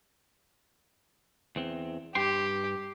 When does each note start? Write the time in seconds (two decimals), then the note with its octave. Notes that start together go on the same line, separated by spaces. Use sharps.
1.56 E2 C4
2.15 G2 G4 G5 C6